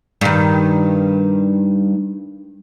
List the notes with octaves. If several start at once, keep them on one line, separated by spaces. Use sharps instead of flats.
G2 D#3